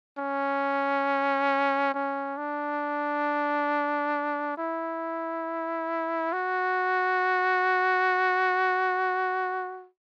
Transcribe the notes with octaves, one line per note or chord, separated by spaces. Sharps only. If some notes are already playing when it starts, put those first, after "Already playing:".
C#4
C#4
D4
E4
F#4